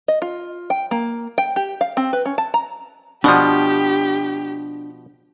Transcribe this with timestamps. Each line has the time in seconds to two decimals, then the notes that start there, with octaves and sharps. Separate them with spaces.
0.08 D#5
0.22 F4
0.70 G5
0.91 A#3
1.38 G5
1.56 G4
1.81 F5
1.97 C4
2.13 B4
2.26 C#4
2.38 A5
2.54 A#5
3.24 B2 F3 D4 G4 F#5